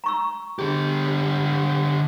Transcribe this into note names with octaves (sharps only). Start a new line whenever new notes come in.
A#5 C#6 E6
D3 G4 G#4